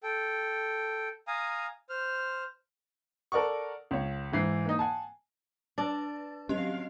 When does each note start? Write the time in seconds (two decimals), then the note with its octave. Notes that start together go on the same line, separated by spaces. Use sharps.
0.03 A4 G5
1.27 F5 G#5 A#5 D#6
1.89 C5 F6
3.32 A4 A#4 D5 F#5 C#6
3.91 C#2 C#5
4.32 G#2 E3 C7
4.65 A#3 D#4
4.79 F#5 G#5 A5
5.78 D4 B4 A6
6.49 F#3 C4 C#4 G4 D#5 F5 F7